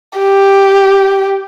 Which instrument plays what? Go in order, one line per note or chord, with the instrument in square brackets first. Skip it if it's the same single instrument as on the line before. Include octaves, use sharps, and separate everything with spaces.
[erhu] G4